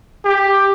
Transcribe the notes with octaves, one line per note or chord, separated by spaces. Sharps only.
G4